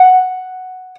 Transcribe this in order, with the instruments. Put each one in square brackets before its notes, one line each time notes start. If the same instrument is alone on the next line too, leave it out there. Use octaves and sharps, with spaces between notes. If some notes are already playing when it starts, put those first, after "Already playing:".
Already playing: [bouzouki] F#5